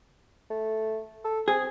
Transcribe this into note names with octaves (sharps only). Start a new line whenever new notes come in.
A3
A4
C4 G#4